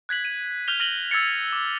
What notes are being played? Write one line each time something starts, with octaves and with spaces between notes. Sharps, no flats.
F#6 G#6 B6 F#7
D#7
F6 G6 B6 F7 G7
F6 A#6 D#7 F#7 G7
E6 G#6 A6 C#7
D6